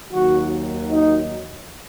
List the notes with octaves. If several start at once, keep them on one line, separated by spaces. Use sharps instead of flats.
D#2 D#3 F#3 F#4
D#4